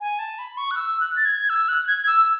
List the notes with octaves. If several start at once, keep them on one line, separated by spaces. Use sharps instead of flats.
G#5
A5
B5
C#6
F#6
E6
F#6
A6
G#6
E6
F#6
G#6
E6